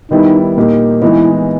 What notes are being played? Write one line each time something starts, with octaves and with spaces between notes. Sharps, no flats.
D#3 G3 B3 D#4 E4
A#2 A#3 D#4 G4
E3 G#3 B3 D#4 E4